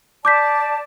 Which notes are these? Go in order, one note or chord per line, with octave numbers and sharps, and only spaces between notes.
D5 A5 D6 G6 B6